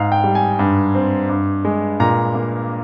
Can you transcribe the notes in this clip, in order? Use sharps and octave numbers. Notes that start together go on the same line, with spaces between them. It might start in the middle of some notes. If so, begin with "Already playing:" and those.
Already playing: G#2 F5
G5
G3
G#5
G2
C4
G2
G#3
A#2 A#5
A#3